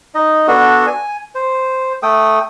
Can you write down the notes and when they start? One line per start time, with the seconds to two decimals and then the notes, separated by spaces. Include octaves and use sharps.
0.15 D#4 D#5
0.48 B3 D4 F#4 A4
0.87 G#5
1.35 C5
2.03 A3 A4 G5 D#6